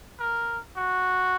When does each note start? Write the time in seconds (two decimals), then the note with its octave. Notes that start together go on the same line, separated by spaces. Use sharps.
0.20 A#4
0.76 F#4